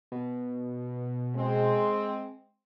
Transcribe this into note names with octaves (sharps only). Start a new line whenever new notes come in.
B2
G#3 C4